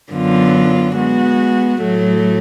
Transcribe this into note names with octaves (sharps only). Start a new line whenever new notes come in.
F#2 D3 F#3 B3 F4
G#3 B3 F#4
A2 F#3 A3